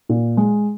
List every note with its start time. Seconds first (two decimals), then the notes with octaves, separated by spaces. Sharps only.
0.09 A#2
0.37 G#3